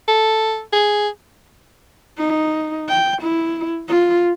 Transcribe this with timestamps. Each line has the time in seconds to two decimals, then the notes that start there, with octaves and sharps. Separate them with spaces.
0.08 A4
0.73 G#4
2.18 D#4
2.89 G5
3.22 E4
3.88 F4